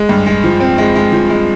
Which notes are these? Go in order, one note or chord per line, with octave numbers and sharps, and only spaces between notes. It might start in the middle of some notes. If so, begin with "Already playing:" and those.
Already playing: G#3
G2
G#3
F3
C4
G#3
G#3
F3
G#3